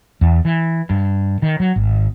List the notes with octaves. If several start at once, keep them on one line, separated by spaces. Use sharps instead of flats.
E2
E3
G2
D#3
F#3
G#1